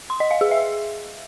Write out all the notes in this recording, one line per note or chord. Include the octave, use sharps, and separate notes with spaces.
C6
D#5
F5
G#4
E5